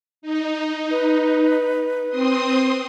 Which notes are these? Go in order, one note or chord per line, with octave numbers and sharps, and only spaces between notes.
D#4
B4
C4 C6 D#6